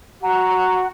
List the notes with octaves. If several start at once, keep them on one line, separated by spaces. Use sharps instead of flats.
F#4 F#5 A#5